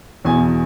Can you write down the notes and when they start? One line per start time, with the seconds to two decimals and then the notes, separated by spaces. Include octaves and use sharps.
0.25 E2 B2 G#5